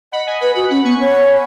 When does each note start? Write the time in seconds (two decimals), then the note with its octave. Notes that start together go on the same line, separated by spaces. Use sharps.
0.12 D#5 F#5 B5
0.27 D#5 G#5
0.41 B4 F#5 B5
0.55 F#4 F#5 B5
0.70 C#4 F#5 B5
0.84 B3 G#5 C#6
1.00 C#5